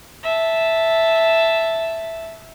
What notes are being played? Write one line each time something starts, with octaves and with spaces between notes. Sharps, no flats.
E5 A5